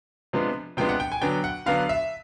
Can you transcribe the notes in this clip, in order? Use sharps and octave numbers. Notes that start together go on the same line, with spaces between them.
C3 F3 G#3 B3 D4
C3 F3 G#3 B3 D4 G5
F#5
G5
G#5
D3 F#3 B3 D4 G5
F#5
D3 F#3 B3 D4 F5
E5